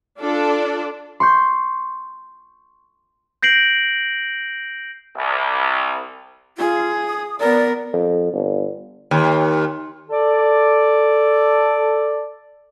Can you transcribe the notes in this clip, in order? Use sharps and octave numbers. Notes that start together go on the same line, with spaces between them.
D4 F4 A4 D5
C6 C#6 G6
G6 A#6 C7 D7 F#7
C2
F4 G#4
D#6
B3 A#4 D5
F2
G1
D#2
A4 D5